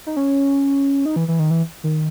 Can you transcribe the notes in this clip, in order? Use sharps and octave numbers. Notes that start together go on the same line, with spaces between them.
D#4
C#4
D#4
E3
E3
D#3
E3
D#3